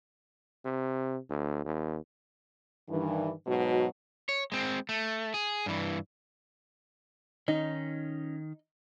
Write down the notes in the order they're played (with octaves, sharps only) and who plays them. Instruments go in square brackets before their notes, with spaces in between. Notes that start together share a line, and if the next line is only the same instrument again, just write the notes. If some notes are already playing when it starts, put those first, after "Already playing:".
[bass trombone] C3
D2
D#2
[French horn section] G2 D#3 E3
G#2 B2 F#3 F#4
[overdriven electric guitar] C#5
G#3 C4
A3
G#4
G2 E3
[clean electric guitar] D#3 [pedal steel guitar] C#4 D#5 [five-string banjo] D#4